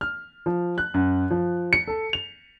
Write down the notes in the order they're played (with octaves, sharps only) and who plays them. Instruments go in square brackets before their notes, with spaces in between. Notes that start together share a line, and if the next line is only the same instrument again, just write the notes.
[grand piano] F6
F3
F#6
F#2
F3
C#7
A4
F7